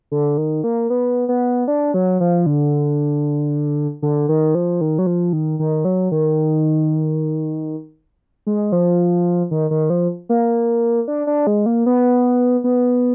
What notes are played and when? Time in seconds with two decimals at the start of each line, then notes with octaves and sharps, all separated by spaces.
0.12 D3
0.37 D#3
0.64 A#3
0.90 B3
1.29 B3
1.68 D4
1.94 F#3
2.20 F3
2.46 D3
4.02 D3
4.29 D#3
4.55 F3
4.81 D#3
4.99 F#3
5.07 F3
5.33 D#3
5.59 D#3
5.85 F#3
6.12 D#3
8.47 G#3
8.72 F3
9.51 D#3
9.71 D#3
9.90 F3
10.29 A#3
11.08 D4
11.27 D4
11.47 G#3
11.66 A#3
11.86 B3
12.64 B3